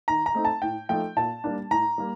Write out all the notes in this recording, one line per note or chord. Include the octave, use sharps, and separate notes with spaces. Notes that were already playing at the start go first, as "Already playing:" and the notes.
D#3 A#5
A#5
A3 C4 D#4
A5
A2 G5
F3 A3 D#4 G5
A#2 A5
G3 A#3 D4
A2 A#5
G3 A#3